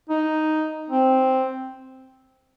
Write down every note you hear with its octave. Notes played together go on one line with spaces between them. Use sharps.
D#4
C4